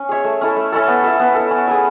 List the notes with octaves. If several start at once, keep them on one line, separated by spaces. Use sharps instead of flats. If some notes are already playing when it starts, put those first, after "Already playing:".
Already playing: C#4
G#4 C#5 E5
A3
C#4 E4 A4
A3
C#4 E4 A4
B3
E4 A4
B3
A4
E4
C#4
G#4 B4 E5